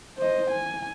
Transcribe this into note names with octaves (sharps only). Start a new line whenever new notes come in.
C5 D#5
G#5